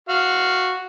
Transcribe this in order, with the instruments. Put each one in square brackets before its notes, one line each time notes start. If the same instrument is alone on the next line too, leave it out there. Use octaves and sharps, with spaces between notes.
[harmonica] F#4 F5